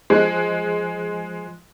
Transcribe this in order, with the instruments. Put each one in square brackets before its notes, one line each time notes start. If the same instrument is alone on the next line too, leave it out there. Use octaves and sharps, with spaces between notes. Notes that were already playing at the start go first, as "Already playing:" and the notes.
[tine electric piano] F3 F#6 [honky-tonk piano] G#3